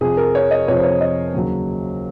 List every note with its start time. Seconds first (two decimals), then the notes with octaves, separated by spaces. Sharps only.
0.01 F2 C3 F3 G#4
0.17 A#4
0.35 C#5
0.51 D#5
0.67 F2 C3 F3 C#5
0.76 C5
0.84 C#5
1.01 D#5
1.34 D#2 C#3 F#3